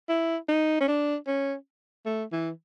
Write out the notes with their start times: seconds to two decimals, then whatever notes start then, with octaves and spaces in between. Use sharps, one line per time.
0.09 E4
0.48 D#4
0.80 C#4
0.88 D4
1.27 C#4
2.06 A3
2.32 E3